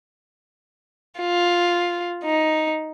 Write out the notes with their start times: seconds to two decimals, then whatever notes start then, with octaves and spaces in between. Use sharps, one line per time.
1.19 F4
2.24 D#4